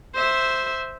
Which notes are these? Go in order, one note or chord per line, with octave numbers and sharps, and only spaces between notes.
C5 E5